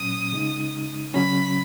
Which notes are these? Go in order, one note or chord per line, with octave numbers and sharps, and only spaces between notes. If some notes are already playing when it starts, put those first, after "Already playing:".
Already playing: A#2 F#3 C#4 D#6
C#3 G#3 D#4
C#3 F#3 C#4 B5